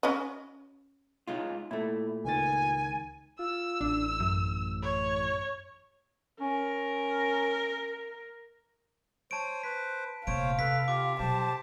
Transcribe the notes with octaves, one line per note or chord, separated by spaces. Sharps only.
C#4 F#4 D#5
G#3 D#4 F4
A#2 A3 E4
C#2 D#3 G#5 A6
F4 E6
A1 D4
F#2
C#5
C#4 A#4
C5 C#5 A5 D7
B4 C5 B6
F1 A#2 C5 C#5 F5 D7
C3 A4 B4 B6
F4 G4 D6
B2 F#3 G4 C5 A5